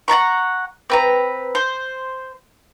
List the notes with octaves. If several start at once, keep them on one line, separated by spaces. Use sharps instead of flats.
F#5 A5 A#5 C#6
C4 B4 A#5
C5